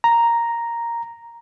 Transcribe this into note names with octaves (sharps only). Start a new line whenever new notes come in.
A#5